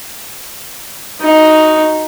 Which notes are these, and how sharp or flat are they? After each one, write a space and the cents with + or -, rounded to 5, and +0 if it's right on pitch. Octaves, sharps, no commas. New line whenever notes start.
D#4 +5 F#4 +0